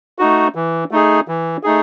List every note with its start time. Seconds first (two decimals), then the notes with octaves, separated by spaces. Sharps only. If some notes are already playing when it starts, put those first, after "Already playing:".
0.19 A3 D#4 F#4
0.55 E3
0.91 A3 D#4 G#4
1.28 E3
1.63 A3 D#4 G#4